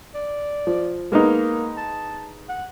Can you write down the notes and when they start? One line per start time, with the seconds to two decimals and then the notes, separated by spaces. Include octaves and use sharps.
0.14 D5
0.67 F3
1.12 G#3 A#3 B3 D#4
1.77 A5
2.49 F#5